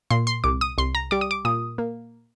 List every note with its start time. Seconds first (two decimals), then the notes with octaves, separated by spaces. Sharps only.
0.11 A#2 C6
0.27 C6
0.44 C2 D6
0.61 D#6
0.78 C2 C6
0.95 A#5
1.11 G3 D6
1.21 D#6
1.31 D6
1.45 A#2 D#6
1.78 A#3